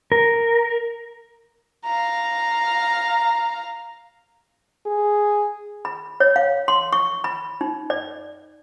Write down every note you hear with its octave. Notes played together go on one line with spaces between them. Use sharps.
A#4
F5 A#5
G#4
B5
C#5
F5
C6
C#6
B5
D#4
D5